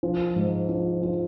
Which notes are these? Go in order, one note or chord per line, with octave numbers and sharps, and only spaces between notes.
F3
G#2
F3
F3